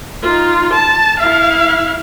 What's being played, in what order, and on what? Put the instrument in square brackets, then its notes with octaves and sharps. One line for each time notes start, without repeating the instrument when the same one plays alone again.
[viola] D#4 F4
A5
E4 F5